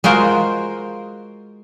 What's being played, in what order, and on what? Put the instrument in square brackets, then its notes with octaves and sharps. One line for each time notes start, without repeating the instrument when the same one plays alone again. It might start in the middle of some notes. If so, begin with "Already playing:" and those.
[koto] G#3 F4 F#4 A#4 C5